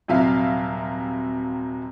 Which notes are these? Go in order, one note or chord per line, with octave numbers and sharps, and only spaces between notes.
D#1 C3 F#3 E5 F5